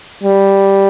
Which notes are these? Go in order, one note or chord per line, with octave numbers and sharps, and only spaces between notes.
G3